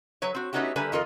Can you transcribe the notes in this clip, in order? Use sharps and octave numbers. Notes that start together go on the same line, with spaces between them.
F#3 B4 C#5
C4 F#4
A3 B3 C#4 D#4 F#4 G4
D3 G3 A#3 G4 B4 G#5
F2 D#3 F4 A4 A#4 D#5